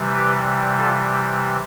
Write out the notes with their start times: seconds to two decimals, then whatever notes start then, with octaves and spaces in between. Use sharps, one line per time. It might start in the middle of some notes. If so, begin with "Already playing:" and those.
Already playing: C3 E3 G3
0.14 G4 B4
0.78 F4 A4
1.11 G4